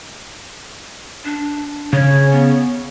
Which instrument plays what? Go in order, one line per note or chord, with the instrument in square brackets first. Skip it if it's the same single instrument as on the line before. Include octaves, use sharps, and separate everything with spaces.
[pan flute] D4
[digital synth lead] C#3 [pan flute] C#5
[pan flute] B3